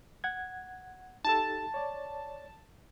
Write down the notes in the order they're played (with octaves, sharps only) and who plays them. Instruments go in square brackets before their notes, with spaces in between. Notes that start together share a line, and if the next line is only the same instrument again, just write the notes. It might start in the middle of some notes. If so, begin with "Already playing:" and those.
[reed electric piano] F#5 G#6
[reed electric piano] D#4 G4 A4 [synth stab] A5
[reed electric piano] C#5 D5